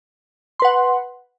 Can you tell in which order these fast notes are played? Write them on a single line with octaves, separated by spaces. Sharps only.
C6 B4 F#5